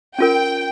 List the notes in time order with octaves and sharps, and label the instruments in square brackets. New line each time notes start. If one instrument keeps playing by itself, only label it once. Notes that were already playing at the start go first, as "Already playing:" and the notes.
[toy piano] C#4 F4 A#4 [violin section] G5